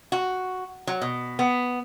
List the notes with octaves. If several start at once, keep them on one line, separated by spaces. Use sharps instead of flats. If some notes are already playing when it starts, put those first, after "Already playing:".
F#4
F#3
B2
B3